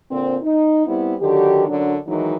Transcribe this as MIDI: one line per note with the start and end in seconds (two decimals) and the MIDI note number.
0.10 0.36 46
0.10 0.36 50
0.10 0.36 60
0.42 0.85 63
0.87 1.15 55
0.87 1.15 59
0.87 1.15 60
0.87 1.15 64
1.21 1.66 50
1.21 1.66 51
1.21 1.66 54
1.21 1.66 67
1.67 1.96 42
1.67 1.96 50
1.67 1.96 54
1.67 1.96 62
2.07 2.35 51
2.07 2.35 52
2.07 2.35 54
2.07 2.35 56
2.07 2.35 63